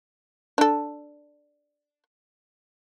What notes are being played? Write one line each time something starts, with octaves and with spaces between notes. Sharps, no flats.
D4 A4